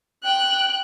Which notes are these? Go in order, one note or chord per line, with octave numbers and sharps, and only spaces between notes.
G5 F#6